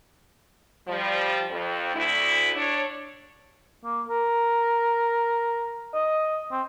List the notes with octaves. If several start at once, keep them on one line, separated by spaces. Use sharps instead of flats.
F3 G3
F2
D2 E4
D4 C#5
A#3
A#4
D#5
C4